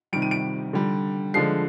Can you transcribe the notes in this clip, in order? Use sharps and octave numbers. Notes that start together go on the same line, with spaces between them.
C3 D#3 G3 D7
D#7
D7
D3 G3
D3 F3 G#3 C7